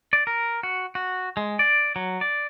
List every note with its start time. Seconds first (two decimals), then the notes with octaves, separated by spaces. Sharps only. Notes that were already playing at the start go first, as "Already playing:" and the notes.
0.13 D5
0.27 A#4
0.63 F#4
0.95 F#4
1.37 G#3
1.59 D5
1.96 F#3
2.21 D5